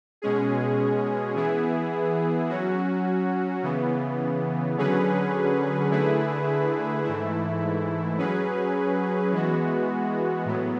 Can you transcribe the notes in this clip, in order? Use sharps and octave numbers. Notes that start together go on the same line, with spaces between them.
B2 G#3 C#4 G#4
E3 B3 E4 G#4
F#3 C#4 F#4
C#3 E3 B3
D3 F#3 C#4 G#4 B4
D3 A3 E4 G#4 B4
G#2 E3 A3 E4
F#3 C#4 G#4 B4
E3 G#3 B3 F#4
A2 F#3 B3